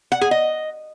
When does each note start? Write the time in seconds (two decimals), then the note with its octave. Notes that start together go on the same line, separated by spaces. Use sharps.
0.12 F#5
0.21 G#4
0.31 D#5